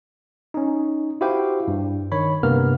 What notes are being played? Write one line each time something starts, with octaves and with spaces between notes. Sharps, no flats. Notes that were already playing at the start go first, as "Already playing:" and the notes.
C#4 D#4
E4 F#4 G4 C5 F5 G5
G2
D#3 C#5 B5
G2 C3 A#3 B3 A#4 F6